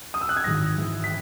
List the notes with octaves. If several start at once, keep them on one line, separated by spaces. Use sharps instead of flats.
D#6
E6
F#6
G#6
G#1 G#2 E3 A#6
G#1 G#2 E3
B6